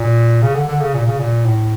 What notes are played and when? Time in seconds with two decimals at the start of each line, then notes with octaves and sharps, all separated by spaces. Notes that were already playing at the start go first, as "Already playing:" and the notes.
Already playing: A#2
0.42 C#3
0.55 D3
0.68 D3
0.81 C#3
0.94 A#2
1.06 C#3
1.19 A#2
1.45 A2